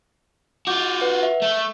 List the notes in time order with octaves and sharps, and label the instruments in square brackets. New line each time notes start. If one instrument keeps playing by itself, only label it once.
[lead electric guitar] F4 F#4 [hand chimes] D6 G6
[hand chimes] B4 F#5
E5
[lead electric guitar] A3